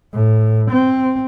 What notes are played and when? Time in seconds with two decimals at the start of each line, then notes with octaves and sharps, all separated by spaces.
0.13 A2
0.71 C4